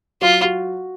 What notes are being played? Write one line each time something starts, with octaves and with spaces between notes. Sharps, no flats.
F#3 F4
F#4